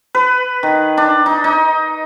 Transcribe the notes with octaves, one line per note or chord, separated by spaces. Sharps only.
B4
D#3
D4
D#4
D#4